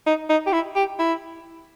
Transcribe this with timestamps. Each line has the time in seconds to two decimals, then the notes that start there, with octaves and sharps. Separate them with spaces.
0.06 D#4
0.29 D#4
0.47 G4
0.53 E4
0.76 G4
0.99 E4